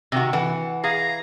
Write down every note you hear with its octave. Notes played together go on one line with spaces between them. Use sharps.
C3 D#3 F#4
E3 F#5
G#4 F5 A#5